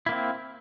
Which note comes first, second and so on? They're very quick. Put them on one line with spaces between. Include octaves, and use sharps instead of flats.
E4 A#3 C4